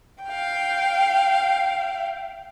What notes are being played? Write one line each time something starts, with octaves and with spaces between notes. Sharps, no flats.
F5 G5